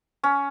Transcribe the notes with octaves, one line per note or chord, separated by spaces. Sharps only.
C#4